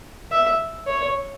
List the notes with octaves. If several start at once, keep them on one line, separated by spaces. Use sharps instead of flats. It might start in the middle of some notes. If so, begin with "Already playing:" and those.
E5
C#5